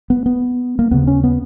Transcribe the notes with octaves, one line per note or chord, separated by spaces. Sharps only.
B3
B3
A#3
D#2 C#3 B3
C#4
B3